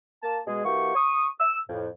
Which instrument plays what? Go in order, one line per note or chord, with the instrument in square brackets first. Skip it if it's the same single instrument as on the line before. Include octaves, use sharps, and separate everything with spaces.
[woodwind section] A#3 A5
B2 G#3 G#4
E3 A#3 F#4 G4 C#6
C#6 D#6
E6
F2 A2